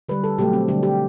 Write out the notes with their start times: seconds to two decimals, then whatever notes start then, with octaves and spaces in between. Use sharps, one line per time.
0.09 D3 G3 B4
0.24 A4
0.38 B2 F#3 A3 G4
0.53 C4
0.68 D3 G3 D4
0.83 G4